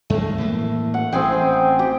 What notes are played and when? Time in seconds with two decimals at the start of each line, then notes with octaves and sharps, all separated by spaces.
0.10 F2 D#3 G#3 A3
0.38 A2 E3 A#3
0.94 F#5
1.12 A1 C4 G#4 G5
1.79 G4